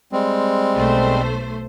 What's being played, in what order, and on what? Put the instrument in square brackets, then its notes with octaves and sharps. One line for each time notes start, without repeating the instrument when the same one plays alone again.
[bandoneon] G3 G#3 C4
[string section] B1 A3 C5